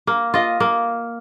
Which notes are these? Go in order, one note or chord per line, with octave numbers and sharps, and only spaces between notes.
A#3
F4 D#5
A#3